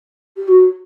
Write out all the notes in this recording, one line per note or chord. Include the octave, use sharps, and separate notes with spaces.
G4
F#4